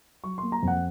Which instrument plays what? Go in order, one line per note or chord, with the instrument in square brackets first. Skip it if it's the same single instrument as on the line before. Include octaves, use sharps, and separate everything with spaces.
[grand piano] F#3 C#6
A#3 C6
A#5
F2 F#5